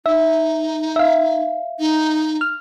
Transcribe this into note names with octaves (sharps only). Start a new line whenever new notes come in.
D#4 E5
E5 F5
D#4
F6